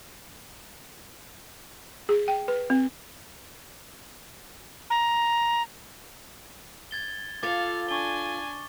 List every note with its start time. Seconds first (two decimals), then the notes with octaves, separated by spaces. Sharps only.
2.09 G#4
2.28 G5
2.48 B4
2.70 C4
4.90 A#5
6.91 G#6 A6 G7
7.43 F4 A4 F5 D6 A6
7.89 D4 G#5 C#6 D6 G7